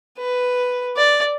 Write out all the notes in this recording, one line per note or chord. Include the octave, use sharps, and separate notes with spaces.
B4
D5